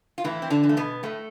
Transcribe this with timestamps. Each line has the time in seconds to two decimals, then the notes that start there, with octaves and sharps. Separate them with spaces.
0.18 F4
0.24 A2 E3 E4
0.42 C4
0.50 D3 D4
0.63 E3
0.69 A3
0.77 B2 B3
1.03 A2 A3